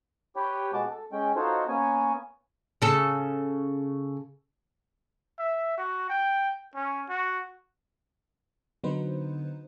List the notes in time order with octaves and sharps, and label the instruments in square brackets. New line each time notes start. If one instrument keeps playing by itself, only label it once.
[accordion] G4 B4 C#5 G5
B2 G#3 F#4 A5 D6
A4
G#3 C#4 G5
D#4 F4 F#4 A4 C5 C#5
A#3 B3 C#4 C#5 G#5
[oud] C#3 A4
[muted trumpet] E5
F#4
G5
C#4
F#4
[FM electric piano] D3 F#3 B3 D#4 B4 C5